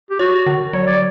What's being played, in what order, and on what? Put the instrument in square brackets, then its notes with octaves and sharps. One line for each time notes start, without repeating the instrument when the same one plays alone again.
[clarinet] G4
[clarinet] F#4 [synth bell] C#5
[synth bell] D3
[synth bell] F#3 [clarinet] C#5
[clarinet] D5